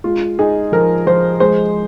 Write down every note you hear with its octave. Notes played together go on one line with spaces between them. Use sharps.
G#3 F4
D#4 G#4
F3 A#4
F3 C5
G#3 C5